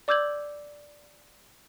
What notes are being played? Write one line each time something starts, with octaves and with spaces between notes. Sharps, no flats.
D5 D6 E6 G6 G#6 F#7